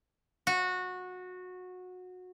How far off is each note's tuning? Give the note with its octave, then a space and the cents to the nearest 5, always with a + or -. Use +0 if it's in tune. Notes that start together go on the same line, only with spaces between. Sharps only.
F#4 -20